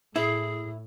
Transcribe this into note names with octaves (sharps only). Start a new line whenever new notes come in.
A2 E4 G#4